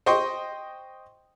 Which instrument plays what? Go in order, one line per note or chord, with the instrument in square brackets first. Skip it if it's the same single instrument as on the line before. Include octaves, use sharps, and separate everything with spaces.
[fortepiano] C5 D#5 G5 C6 C#6